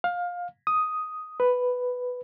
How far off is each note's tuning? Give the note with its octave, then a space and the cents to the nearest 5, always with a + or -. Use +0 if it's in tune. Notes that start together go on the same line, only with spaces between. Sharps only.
F5 +20
D#6 +5
B4 +5